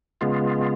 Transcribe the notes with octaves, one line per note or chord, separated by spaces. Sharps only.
C#3 G#3 B3 F4